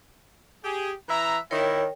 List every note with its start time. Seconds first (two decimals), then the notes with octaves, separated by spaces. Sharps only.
0.64 G4 G#4
1.09 E3 E5 A#5
1.51 D#3 E4 A#4 C#5 G5